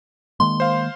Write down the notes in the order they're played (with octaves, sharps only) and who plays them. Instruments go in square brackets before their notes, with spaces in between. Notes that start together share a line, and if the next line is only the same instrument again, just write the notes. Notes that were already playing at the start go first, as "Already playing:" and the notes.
[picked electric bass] D#3 G#3 A#3 [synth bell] C6
[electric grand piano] C5 F5